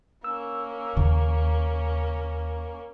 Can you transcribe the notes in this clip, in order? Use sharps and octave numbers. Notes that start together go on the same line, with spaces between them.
A#3 C#4 E6
D#2 C#3